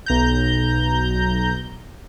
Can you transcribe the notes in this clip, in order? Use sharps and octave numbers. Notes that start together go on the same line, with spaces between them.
B1 A#5 G6